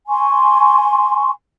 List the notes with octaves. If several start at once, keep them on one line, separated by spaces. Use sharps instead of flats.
G#5 C6 C#6